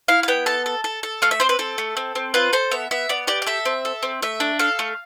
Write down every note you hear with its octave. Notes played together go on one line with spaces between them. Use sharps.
E4 F5
F5
B3 G5
A4 A5
A4
A4
A4
A3 F5
E5
C4 C5
B4
C4 A4
A3
C4
C4
F4 B4
A4 C5
B3 E5
B3 E5
B3 D5
G4 D5
D5
A4 E5
C4
A4
C4
A3 E5
D4
A4 F5
A3